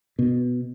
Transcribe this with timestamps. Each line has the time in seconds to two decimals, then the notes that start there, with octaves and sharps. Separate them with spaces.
0.19 B2